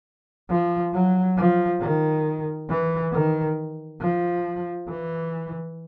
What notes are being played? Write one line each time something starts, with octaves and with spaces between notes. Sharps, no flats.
F3
F#3
F3
D#3
E3
D#3
F3
E3